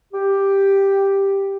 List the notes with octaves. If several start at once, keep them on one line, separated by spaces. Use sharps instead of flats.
G4